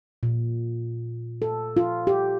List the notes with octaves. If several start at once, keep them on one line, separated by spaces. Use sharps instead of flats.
A#2
A4
F4
G4